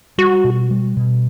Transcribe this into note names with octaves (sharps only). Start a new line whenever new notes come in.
G3 F#4
B2
G3
B2